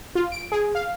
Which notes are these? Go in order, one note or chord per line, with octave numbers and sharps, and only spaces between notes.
F4
D7
G#4
F5